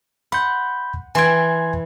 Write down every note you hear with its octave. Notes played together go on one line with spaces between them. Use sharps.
F#5 B5 C6 G6
E3 G5 G#5 C6 G#6